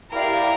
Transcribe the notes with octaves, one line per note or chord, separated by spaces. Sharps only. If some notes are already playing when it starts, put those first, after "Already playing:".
E4 G4 A#4 D5 F5